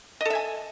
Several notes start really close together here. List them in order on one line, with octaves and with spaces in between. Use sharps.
D#5 A4 E5 G#5